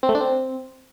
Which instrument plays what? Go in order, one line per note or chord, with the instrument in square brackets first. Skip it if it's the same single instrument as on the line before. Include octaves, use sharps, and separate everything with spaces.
[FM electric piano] C4
A3
D4
C4